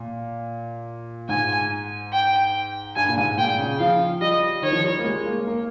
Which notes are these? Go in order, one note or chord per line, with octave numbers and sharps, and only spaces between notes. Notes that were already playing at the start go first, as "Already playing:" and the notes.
Already playing: A#2
G#2 G#5
G5
G2 G#5
A#2
G#2
A#2 G5
C#3
F3 F5
G3 D#5
D#3 C#5
F3
G3
A#3
G#3
A#3
A#3